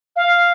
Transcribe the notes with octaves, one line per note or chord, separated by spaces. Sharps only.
F5